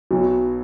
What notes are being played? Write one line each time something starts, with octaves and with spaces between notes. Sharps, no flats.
B1 B2 F#3